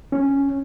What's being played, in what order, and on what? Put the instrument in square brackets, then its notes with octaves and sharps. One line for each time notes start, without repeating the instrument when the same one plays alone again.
[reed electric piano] C#4